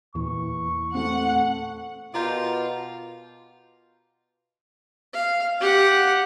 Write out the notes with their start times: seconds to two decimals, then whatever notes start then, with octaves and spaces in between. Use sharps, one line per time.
0.15 E2 A#2 E3 C#6
0.95 A3 C4 F#5
2.14 B2 F4 G4 A#4 D5
5.14 F5
5.61 G4 F#5